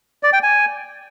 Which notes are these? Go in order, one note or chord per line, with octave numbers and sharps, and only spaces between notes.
D5
G5
G#5